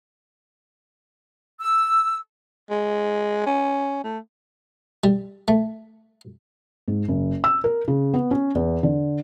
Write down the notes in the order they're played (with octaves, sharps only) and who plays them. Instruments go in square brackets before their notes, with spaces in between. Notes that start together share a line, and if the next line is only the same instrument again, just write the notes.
[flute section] E6
[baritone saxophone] G#3
C#4
A3
[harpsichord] G3
A3
[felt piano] G#2
F#1
E6
A#4
C#3
B3
C#4
E2
D3